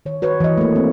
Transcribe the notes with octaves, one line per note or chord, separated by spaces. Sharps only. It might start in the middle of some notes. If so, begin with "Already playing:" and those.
D#3 C#5
F#4 B4 C#5
E3 D#5
A3 A#3
C4